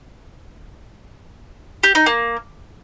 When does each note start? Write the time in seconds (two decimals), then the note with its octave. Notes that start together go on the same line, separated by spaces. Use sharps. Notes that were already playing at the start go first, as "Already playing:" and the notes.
1.83 G4
1.95 D#4
2.06 A#3